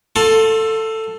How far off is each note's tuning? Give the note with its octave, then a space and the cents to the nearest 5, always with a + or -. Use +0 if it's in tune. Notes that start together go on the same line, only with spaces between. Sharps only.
F4 +40 A4 +10 C6 +25